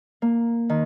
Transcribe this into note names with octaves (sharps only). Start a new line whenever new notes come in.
A#3
D#3